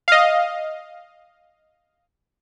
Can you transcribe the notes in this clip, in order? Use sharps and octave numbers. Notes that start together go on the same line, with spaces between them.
D#5 F5